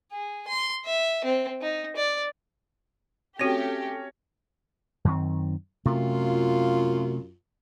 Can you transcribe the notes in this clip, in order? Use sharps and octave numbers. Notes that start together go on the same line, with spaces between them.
G#4
C6
E5
C4
D#4
D5
A3 C4 C#4 F#4 G4 C#5 A#6
F#2 D#3 C4
F#2 C3 A3 F4